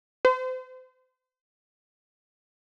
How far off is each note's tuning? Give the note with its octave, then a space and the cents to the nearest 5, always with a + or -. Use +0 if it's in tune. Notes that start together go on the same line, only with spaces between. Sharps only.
C5 -40